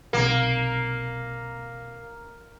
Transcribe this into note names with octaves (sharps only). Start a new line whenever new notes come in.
B1 C3 A#3